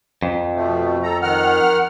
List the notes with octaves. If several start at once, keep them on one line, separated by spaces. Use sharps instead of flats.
F2
B2 F3 A3
A4 A#5
D#3 F#5 F6